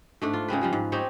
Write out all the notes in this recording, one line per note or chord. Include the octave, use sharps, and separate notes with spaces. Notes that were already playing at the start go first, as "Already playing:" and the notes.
G#2 A3 D4
F4
C#3 G#3 C4 B4
F3 G3 G#3
G#2
C4 D#4 G4 C#5